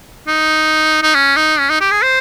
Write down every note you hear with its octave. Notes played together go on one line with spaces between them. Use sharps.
D#4
D#4
C#4
D#4
C#4
D#4
G4
G#4
C5